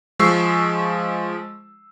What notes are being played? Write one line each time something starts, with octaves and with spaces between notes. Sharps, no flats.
F3 G#3 C#6 E6 C7